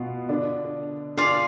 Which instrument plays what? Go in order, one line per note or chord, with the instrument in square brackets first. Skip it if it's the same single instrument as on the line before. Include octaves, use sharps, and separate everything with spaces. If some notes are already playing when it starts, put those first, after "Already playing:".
Already playing: [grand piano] B2 B3 [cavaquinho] F4
[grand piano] D3 D4
[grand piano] D3 D4 [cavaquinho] F4 G#4 D5 F5